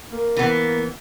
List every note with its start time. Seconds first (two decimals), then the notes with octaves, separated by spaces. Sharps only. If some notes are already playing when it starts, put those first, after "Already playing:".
0.12 A#3
0.37 E3 B3